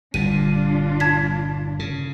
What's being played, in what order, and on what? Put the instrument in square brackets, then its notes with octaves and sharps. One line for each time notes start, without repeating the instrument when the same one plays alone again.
[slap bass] G1 A#2 [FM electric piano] G3 [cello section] D4 F4 [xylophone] D#7
[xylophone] A5 G#6 B6
[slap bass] C#3